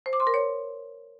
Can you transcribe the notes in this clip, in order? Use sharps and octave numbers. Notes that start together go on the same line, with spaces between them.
C5
D6
C6
A#4
C#5